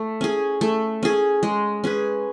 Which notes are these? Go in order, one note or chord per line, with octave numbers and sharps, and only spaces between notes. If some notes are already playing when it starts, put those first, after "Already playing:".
Already playing: A3
C#4 G#4
A3
C#4 G#4
G#3
C#4 G#4 B4